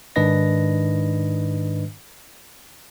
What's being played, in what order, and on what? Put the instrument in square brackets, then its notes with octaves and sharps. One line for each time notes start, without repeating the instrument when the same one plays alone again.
[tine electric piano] G#2 D#3 D4 B4 D#5 A#6